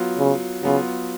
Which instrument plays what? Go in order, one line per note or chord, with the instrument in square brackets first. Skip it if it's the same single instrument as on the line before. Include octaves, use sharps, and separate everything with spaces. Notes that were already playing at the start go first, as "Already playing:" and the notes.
Already playing: [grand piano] F#3 B3 F4
[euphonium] C#3
[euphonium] C#3 [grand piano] F#3 B3 F4